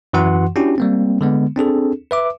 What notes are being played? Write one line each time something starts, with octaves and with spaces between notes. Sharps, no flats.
F#2 E3 F#4 F#5 C6
C#4 D4 E4 F#4 G4
G3 A#3 C4
D3 G#3 B3
C4 D4 G#4 A4
B4 E5 D6